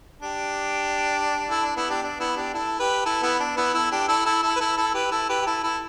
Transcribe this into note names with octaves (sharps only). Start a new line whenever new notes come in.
D4 G4
E4 A4
D4
B3 E4
D4 G4
D4
B3 E4
D4 G4
E4 A4
G4 B4
E4 A4
B3 E4
D4
B3 E4
E4 A4
D4 G4
E4 A4
E4 A4
E4 A4
B4
E4 A4
E4 A4
G4 B4
E4 A4
G4 B4
G4
E4 A4
E4 A4